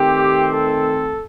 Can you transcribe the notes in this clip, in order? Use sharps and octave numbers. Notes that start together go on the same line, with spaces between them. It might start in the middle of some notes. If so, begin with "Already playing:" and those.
Already playing: D#3 A3 C4 G4
A4